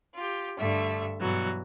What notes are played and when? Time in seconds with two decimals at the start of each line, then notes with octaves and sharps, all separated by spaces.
0.14 F4 G4
0.57 G2 D3 A3 E5
1.19 G2 B2 E3 F#3